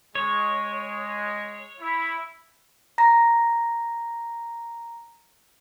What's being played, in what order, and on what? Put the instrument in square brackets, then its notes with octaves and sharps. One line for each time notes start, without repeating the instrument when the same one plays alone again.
[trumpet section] G#3 [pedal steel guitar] C#5
[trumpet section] E4
[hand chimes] A#5 A#6